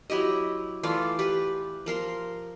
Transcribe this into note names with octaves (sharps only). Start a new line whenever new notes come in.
F#3 E4 G4 D#5
E3 A3 F4 D5
G4 B4
F3 A#4 C6